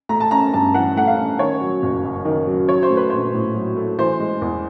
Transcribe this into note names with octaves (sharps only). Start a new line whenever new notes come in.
A3 A#5
A5
C#4 A#5
G2 A5
E3 F#5
A3 F#5
F5
C#4
D#3 C#5
F#3
F#1
F#2
D#3
F#3
F#3 C#5
C5
A3
B4
A#1 C5
A2
F#3
A3
E3 C5
G#3
E2